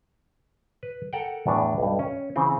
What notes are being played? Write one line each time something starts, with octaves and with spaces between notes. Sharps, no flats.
B4
A4 A#4 F#5 G5
E2 A2 D4
B1 G2
C#4
C#3 E3 C4